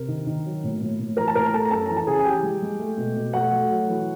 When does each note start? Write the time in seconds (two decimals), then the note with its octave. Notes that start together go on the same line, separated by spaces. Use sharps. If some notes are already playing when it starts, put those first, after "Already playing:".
Already playing: C3 A#4
0.08 D#3
0.27 D#3
0.46 F#3
0.64 A2
0.81 A2
0.99 A2
1.17 E3 A#4 A#5
1.28 A5
1.35 A2 A#4 A#5
1.53 A3 A4 A5
1.65 A#5
1.71 F#2 A4 A5
1.86 E3 A#5
1.96 A5
2.07 C#3 G#4 G#5
2.19 G#5
2.25 E3 G4 G5
2.43 G#3
2.62 G#3
2.79 A3
2.98 B2
3.17 B2
3.33 A3 F#4 F#5
3.52 A3
3.71 F#3
3.88 E3